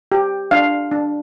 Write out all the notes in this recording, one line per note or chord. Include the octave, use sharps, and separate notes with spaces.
G4
D4 F5
D4